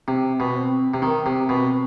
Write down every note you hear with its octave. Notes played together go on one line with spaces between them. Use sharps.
C3 C4
B2
C4
C3
D#3 C4
C3
B2